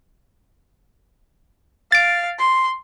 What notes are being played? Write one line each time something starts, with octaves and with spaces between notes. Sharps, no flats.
F5 A6 D7
C6